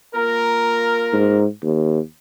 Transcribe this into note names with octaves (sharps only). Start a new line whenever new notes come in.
A#3 F4 A#4
G#2
D#2